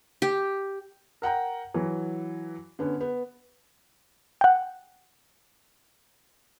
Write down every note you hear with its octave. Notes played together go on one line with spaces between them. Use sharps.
G4
A#4 F#5 G5 A#5
E3 F#3
D3 B3 C#4
B3
F#5 G5